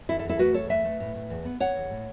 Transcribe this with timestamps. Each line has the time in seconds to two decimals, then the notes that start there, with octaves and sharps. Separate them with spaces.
0.09 E2 E4 A4
0.19 E4 A4
0.24 E2
0.29 E4 A4
0.39 A3 F#4 B4
0.54 E2 A4 C#5
0.69 A3 B4 E5
0.84 A3
1.00 A2
1.15 A2
1.30 E2
1.45 B3
1.60 B3 C#5 F#5
1.75 E2
1.91 A2